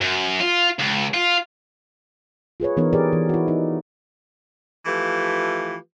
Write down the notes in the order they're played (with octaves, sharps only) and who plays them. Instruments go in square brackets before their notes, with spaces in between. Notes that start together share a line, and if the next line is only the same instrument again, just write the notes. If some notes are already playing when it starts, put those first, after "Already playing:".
[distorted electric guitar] F#2
F4
C#2
F4
[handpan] F4 G#4 B4 C#5
E3 B3 D#4 A#4 C#5
G4 G#4 A#4 B4 D5
E3
E4 F#4
D#4
[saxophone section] E3 F3 A3 F4 G4 B4